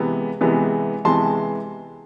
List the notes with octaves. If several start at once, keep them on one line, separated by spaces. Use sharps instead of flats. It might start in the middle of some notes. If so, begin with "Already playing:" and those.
Already playing: C3 E3 G#3 B3
C3 E3 G#3 B3
C3 E3 G#3 B3 A5 C6